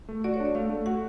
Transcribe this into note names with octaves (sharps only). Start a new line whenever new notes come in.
A3
F#4 D5
C#5
D4
D5
A3 F5
A3
F#4 F#5